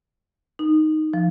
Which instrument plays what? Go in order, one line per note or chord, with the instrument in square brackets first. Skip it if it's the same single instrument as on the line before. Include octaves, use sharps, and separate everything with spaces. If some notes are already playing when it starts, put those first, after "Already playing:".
[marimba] D#4
F3